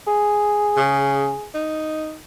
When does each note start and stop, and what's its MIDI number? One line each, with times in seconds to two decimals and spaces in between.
0.08 1.47 68
0.77 1.33 49
1.54 2.17 63